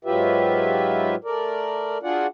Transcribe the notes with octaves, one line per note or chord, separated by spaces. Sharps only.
G#2 F#3 F4 G4 B4 E5
A3 A#4 D5
D4 F4 F#4 G#4 D5 F#5